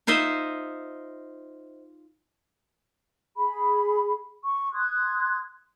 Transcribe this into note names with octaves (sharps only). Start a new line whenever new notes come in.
D#4 F4 C5 D#5 E5
G#4 B5
C#6
C6 D#6 F#6 G#6